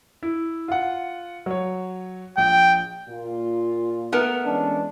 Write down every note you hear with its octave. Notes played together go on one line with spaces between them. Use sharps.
E4
F4 F#5
F#3 C#5
A#1 G5
A#2 F4
A3 B3 A#4
E3 G#3 C#4 D4